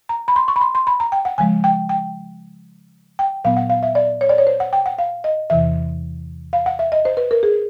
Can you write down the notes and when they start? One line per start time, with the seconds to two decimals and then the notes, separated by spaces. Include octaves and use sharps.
0.09 A#5
0.28 B5
0.36 C6
0.48 C#6
0.56 B5
0.61 C6
0.75 C6
0.87 B5
1.00 A#5
1.12 G5
1.25 F#5
1.38 C#3 F3 G#3 G#5
1.64 G5
1.89 G5
3.19 G5
3.44 A#2 F#3 B3 F5
3.57 F#5
3.70 F5
3.83 E5
3.95 D5
4.21 C#5
4.29 D5
4.38 C#5
4.47 C5
4.60 F#5
4.73 G5
4.86 F#5
4.98 F5
5.24 D#5
5.50 E2 C3 E3 E5
6.53 F5
6.66 F#5
6.79 E5
6.92 D#5
7.05 C5
7.17 B4
7.31 A#4
7.43 G#4